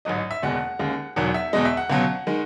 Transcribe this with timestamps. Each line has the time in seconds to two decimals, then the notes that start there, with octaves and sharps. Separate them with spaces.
0.05 A1 G#2 F#3 D#5
0.18 D#5
0.31 E5
0.43 F#1 E2 B2 G#3 F#5
0.79 D#2 C#3 G#3
1.16 E1 E2 D#3 F#3 F#5
1.34 E5
1.53 E2 B2 G#3 D#5
1.65 E5
1.77 F#5
1.90 C#2 B2 F#3
2.27 D#3 G#3